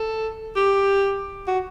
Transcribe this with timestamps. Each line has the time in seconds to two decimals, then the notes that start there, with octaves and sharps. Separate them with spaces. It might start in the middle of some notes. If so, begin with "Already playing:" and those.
Already playing: A4
0.56 G4
1.48 F#4